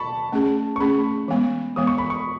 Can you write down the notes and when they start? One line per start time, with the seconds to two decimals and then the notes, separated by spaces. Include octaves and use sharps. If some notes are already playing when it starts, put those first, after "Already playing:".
Already playing: A5 B5 C#6
0.32 A3 C#4 G#4
0.76 C#6
0.80 A3 C#4 G#4 B5
1.28 E3 G#3 B3
1.76 E3 G#3 B3 D#6
1.87 C#6
1.98 B5
2.10 C#6